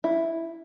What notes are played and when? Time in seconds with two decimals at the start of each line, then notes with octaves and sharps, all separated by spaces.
0.04 E4